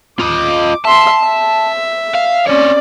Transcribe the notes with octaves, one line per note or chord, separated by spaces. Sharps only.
F4 D#5 D6
E5 A5 C6
E5
F5
C4 C#4 C#5 D5